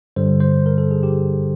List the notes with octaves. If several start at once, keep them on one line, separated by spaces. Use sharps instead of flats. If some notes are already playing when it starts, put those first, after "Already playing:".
G2 D3 G3 C5
C5
A#4
A4
G#4
G4